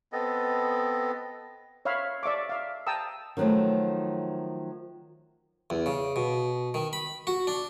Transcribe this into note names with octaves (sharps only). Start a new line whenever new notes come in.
B3 C4 A4 D#5
C#5 E5 F5 B5
D5 E5 C#6 D6
E5 F5
G5 A5 A#5 D#6 E6
D#3 F3 F#3 A3 D#4
E2
C#3
B2
D#3
B5
F#4
D4